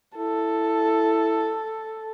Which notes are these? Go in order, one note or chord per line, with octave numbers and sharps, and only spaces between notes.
E4 A4